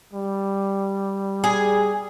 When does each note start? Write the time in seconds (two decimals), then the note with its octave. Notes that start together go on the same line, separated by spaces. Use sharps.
0.13 G3
1.44 G#4